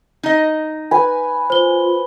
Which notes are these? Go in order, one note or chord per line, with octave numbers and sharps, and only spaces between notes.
D#4 D#5
B4 G#5
F4 C5 G7